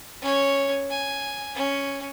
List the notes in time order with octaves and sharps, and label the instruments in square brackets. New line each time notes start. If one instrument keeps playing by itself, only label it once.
[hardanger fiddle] C#4 C#5
G#5
C#4